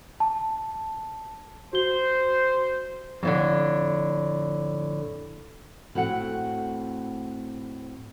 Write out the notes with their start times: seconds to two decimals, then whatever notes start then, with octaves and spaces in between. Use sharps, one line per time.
0.20 A5
1.73 F#4 C5 G7
3.23 F2 A2 D3
5.95 A2 C4 F#4 F#5